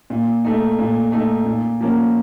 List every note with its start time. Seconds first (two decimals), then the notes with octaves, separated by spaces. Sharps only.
0.10 A#2
0.44 A3 D#4
0.79 A#2
1.12 A3 D#4
1.46 A#2
1.81 F3 A#3 C#4